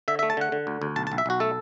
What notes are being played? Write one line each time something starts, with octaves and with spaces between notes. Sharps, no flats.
D3 E5
A3 E5
A5
D3 F#5
D3
D2
D2
B1 A5
B1 A5
E5
B1 F#4
A3 A4